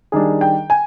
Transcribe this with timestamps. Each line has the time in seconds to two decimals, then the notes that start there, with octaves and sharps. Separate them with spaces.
0.12 D#3 G3 D4 G#4
0.41 G5
0.70 G#5